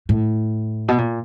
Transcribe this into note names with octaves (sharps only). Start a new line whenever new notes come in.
A2
B2
A#2